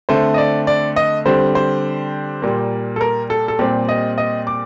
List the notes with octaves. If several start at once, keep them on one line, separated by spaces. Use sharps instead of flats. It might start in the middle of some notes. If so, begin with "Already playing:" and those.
D3 A3 C4 C5
D#5
D5
D5
D#5
D3 G3 C4 C5
C5
A#2 G3 A#3
A4
A#4
A4
A4
A#2 G3 C4 G4
D#5
D#5
D6